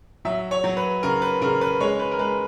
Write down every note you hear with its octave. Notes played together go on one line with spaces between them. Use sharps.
F#3 E5
C#5
F#3
B4
C#3 A#4
B4
C#3 A#4
B4
G#3 C#5
B4
A#4
G#3 B4